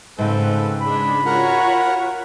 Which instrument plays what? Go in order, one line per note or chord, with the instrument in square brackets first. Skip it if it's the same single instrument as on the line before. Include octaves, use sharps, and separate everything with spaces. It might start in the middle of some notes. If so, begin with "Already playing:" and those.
[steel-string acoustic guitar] G#2 C#3 [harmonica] C4 A4 [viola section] B4
[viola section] G#3 D4 [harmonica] B5
[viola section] F4 F#4 C#5 [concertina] A#4 F#5